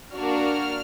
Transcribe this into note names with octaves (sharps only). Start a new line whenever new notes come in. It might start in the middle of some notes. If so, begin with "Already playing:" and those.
A#3 D4 F#4 F6